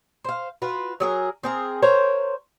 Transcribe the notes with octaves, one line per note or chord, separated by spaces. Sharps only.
C5 F5
F4 F#4 B4
F#3 G#4 A#4
C4 G#4 A#4
A#4 C5 C#5